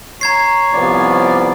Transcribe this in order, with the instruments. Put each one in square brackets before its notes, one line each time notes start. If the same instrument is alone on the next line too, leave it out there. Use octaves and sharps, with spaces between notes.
[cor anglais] C#5 [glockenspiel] A#5 G#6 C7
[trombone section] C2 F3 B3 [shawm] D5